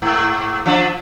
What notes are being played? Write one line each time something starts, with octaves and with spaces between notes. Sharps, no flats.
G#2
F3 D4